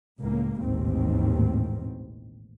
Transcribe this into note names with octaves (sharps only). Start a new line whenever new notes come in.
C#2 A2 A#3
A1 D#2 G#2 B2 D#3 C4